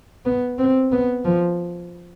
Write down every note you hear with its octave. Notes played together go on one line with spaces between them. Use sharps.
B3
C4
B3
F3